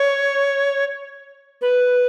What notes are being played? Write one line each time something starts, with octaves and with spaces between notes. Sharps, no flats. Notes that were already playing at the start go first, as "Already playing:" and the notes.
Already playing: C#5
B4